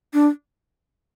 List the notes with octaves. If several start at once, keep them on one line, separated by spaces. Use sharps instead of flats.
D4